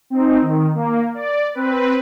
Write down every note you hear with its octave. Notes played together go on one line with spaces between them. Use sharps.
C4 D#4
D#3
A#3
D5
C4 B4